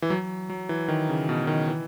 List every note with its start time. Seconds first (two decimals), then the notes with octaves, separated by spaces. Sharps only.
0.02 E3
0.10 F#3
0.50 F#3
0.69 E3
0.88 D#3
1.09 C#3
1.29 B2
1.47 D#3
1.68 E3